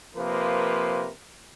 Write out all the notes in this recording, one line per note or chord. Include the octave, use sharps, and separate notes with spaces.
C3 F3 A#3 A#4 B4